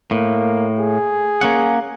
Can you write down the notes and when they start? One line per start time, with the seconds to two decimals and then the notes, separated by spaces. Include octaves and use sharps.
0.11 A2 A#3
0.79 G#4
1.41 A#3 C#4 F#5